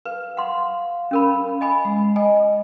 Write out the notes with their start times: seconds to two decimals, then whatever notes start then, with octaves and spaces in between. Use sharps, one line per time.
0.05 B4 F5
0.37 F#5 C6
1.11 C#4 A#4 B5
1.61 D#5 G#5 B5
1.85 G#3
2.16 D#5 G#5